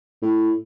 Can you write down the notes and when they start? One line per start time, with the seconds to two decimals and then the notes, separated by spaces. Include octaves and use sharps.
0.22 A2